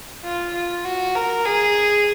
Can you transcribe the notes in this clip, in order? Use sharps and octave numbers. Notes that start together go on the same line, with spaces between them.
F4
F4
F#4
A#4
G#4